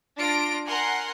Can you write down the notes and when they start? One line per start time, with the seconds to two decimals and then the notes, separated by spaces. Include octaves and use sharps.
0.19 D4 F4 A#6 D7
0.68 A#4 F#5 G#5 C6